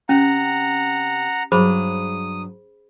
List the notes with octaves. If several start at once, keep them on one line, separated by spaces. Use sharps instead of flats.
C3 C#4 F#5 A#5
G2 F#3 G#4 C5 B5 D#6